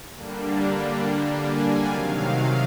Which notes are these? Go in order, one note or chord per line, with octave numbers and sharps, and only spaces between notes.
D3 G3 A#3 D4
G#5
C3 D#3 F#3 F5
F5